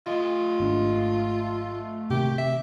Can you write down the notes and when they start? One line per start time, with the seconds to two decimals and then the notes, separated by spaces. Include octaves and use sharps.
0.07 A3 F4 D#5
0.60 G#1 C4 D4
2.10 C3 D#3 A#3 G4
2.38 E5